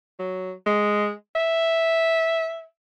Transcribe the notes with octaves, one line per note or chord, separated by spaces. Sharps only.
F#3
G#3
E5